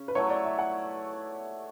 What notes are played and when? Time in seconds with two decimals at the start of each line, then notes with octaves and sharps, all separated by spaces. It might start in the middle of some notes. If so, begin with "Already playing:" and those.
Already playing: C#3 C#4
0.08 B4
0.15 F#3 A3 E4 C#5
0.30 D5
0.44 E5
0.59 F#5